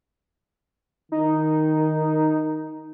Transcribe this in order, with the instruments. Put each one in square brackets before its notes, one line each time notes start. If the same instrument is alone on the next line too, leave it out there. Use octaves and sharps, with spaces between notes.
[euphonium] D#3 [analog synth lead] D#4